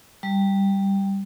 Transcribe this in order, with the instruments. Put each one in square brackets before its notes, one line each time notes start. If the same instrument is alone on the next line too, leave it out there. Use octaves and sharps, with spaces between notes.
[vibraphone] G3